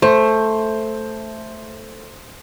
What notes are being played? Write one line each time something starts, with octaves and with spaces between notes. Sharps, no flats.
A3 C5